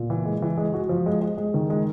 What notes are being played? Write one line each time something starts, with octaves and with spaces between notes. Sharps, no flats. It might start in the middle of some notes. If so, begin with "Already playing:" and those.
Already playing: A#2
E3
G#3
E3
G#3
F#4
F3
G#3
G#3
G#3
D#3
G#3